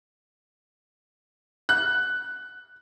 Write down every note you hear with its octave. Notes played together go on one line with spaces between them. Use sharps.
F#6